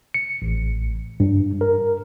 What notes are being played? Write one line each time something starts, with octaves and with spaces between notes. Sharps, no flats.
C#7
A1
G2
A#4